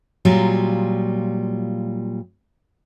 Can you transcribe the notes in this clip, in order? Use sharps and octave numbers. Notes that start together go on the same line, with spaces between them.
A#2 F#3 G3 F4